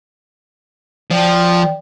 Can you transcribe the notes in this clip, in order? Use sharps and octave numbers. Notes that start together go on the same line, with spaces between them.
F3 D5 G5